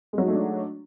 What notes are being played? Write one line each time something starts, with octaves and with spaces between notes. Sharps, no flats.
F#3 G#3 A3 D4 D#4